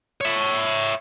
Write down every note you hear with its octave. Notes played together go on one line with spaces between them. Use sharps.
C#5 E5